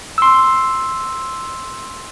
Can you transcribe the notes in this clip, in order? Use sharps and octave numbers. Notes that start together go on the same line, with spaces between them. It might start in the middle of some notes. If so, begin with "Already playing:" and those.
C6 E6